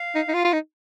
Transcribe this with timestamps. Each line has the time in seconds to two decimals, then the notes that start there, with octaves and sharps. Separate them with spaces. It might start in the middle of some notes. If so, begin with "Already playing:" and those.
Already playing: F5
0.15 D#4
0.28 D#4
0.34 F4
0.45 F4
0.53 D#4